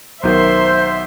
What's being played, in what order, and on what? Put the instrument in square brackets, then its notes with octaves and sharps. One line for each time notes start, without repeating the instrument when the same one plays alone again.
[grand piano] B1 D#3 [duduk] C5 [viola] E5 C6